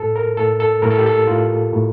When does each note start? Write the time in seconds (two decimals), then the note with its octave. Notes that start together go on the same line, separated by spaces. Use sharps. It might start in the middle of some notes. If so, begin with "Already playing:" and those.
Already playing: A2 A4
0.16 A#4
0.37 A2 A4
0.60 A4
0.82 A2 A#4
0.91 A4
0.98 G4
1.06 A4
1.27 A2 F4
1.73 A2